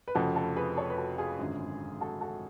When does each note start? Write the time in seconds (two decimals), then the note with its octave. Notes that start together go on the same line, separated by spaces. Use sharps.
0.08 B4
0.15 F1 F2 C#3 F3 F#4 A4
0.36 F#4 A4
0.56 G#4 B4
0.77 A4 C#5
0.90 B4
0.98 F#4 A4
1.18 F4 G#4
1.39 G#1 F#2 D3
2.01 F#4 A4
2.21 F#4 A4